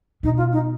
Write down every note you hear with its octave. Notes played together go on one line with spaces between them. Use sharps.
B2 D#4
F4
D#4